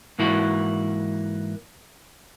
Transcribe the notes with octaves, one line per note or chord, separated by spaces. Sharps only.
G#2 E3 A#3 E4 F#4